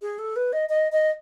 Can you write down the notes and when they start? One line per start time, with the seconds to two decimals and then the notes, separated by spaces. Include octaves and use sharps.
0.02 G#4
0.19 A4
0.36 B4
0.53 D#5
0.69 D#5
0.92 D#5